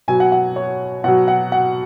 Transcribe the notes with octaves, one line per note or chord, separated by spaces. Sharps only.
B2 F#3 G#5
F#5
F#5
C#5
B2 F#3 F#5
F#5
F#5